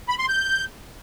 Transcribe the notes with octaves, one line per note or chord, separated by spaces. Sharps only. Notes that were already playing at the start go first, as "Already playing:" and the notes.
B5
C6
G6